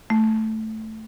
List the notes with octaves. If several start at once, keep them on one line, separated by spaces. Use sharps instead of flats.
A3